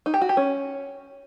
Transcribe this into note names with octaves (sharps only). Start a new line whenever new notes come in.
D#4
G4
F#4
G4
C#4